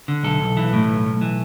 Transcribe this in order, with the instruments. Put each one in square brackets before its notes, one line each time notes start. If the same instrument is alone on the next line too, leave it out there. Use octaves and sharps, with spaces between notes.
[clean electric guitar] D3
B1 A4
B1
E3
A2
B1
B1
E3